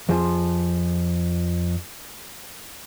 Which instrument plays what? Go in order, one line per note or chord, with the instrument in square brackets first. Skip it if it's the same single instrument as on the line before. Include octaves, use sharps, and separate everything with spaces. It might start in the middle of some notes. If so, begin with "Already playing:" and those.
[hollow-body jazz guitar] F2 F3 G#4